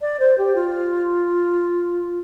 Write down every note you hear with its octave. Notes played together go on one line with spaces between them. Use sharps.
D5
C5
G4
F4